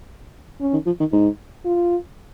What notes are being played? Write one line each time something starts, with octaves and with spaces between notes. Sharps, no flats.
C#4
D#3
F3
D#3
G#2 D#4
F4